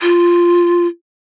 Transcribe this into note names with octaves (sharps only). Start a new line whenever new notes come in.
F4